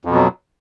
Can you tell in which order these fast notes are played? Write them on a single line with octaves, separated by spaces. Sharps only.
F2 B2 F#3